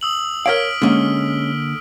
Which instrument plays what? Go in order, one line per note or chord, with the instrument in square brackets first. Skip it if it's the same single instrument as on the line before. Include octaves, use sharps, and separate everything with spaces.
[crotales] D#6 E6 F#7
[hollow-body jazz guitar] A#4 C#5 F5 [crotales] F6 B6 D7
[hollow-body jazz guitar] D3 A#3 [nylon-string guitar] G#3 C#4